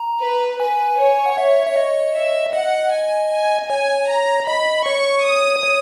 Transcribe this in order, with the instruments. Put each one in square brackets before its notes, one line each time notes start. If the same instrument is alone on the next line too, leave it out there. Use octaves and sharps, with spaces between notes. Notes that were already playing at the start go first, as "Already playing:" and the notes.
Already playing: [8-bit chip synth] A#5
[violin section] B4
[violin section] B4 [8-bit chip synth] G#5
[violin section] C#5
[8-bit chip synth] F#5
E5
E5
D#5
[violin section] E5
[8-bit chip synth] D#5 [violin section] F#5
[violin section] G#5
G#5
[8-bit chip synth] C#5 [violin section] G#5
[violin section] A#5
[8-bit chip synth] D#5 [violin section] B5
[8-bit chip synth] C#5 [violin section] C#6
[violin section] D#6
[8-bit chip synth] C#5